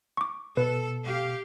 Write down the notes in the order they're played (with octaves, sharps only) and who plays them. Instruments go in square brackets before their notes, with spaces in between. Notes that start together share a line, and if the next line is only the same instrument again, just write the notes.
[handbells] C#6 D6
[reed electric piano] B2 [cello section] A4 [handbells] B4
[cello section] G4 F5